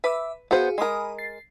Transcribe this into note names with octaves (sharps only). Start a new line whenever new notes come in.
B4 E5 B5 D6 E6
B3 F#4 G#4 C5 F5
G#3 A#4 G#5 B5 D#6
A6 C7